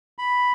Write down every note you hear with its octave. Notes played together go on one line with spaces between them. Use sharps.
B5